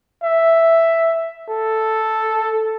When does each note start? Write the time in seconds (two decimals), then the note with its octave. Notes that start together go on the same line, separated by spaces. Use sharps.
0.23 E5
1.49 A4